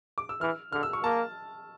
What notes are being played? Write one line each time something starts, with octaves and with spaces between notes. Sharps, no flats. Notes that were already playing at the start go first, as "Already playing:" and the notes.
D6
E6
E3 F6
D3 F6
E6
C#6
A#3 A5